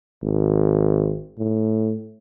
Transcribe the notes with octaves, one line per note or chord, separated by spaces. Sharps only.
G#1
A2